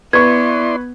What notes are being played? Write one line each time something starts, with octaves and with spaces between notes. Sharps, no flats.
B3 E4 B4 D5 C6 C#6 G#6